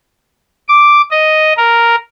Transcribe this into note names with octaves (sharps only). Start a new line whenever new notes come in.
D6
D#5
A#4